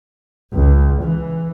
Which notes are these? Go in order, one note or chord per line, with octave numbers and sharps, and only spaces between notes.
C#2
E3